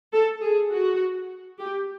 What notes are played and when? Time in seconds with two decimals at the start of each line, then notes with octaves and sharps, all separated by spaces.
0.14 A4
0.43 G#4
0.72 F#4
1.60 G4